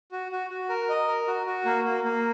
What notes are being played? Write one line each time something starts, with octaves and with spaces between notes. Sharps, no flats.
F#4
F#4
F#4
A#4
D#5
A#4
F#4
F#4
A#3
A#3
A#3